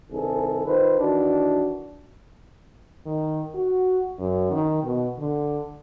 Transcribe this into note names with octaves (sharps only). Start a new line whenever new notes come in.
C2 G2 D#3 G#4 A4
D#3 F4 B4 C5
D#3 E3 D4 F#4
D#3
F#4
F#2
D#3
B2
D3